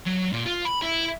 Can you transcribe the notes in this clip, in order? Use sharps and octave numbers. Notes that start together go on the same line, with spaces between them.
F#3
A#2
F4
B5
E4